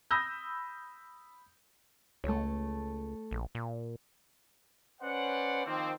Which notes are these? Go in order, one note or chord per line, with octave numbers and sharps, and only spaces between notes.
B5 D#6 E6 G6 A#6
C#2 A3 A4 C#5
A#1
A#2
C#4 B4 C5 D5 F#5
D#3 F3 A#3 C4